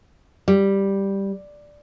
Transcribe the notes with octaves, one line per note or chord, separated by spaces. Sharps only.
G3